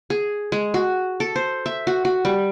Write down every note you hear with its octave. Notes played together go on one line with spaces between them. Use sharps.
G#4
G#3
F#4
A4
C5
E5
F#4
F#4
G3